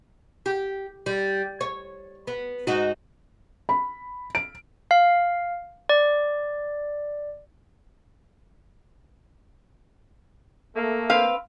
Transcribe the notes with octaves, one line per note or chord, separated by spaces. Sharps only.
G4
G3
C#5
B3
G#2 D#4 F#4
B5
D7
F5
D5
A3 A#3
C4 B4 F5